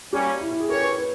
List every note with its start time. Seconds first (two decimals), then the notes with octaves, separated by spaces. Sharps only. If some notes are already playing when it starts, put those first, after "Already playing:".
0.13 G3 A#3 C#4 G4
0.41 E4
0.51 E4
0.60 G#4
0.69 C#4 G4 A#4 C#5
0.80 B4
0.89 A#4
0.98 B4